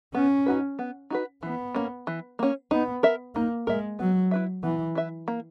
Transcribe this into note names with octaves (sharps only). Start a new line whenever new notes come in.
B3 C#4
D#4 F#4 B4
B3
D#4 F#4 B4
E3 B3
A#3 C#4
E3
A#3 C#4
B3 D#4
A#4 E5
A#3 D#4
G#3 A#4 E5
F#3 B3
E4 B4 E5
E3 B3
E4 B4 E5
A#3